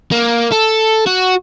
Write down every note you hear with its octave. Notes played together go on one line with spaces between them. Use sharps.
A#3
A4
F#4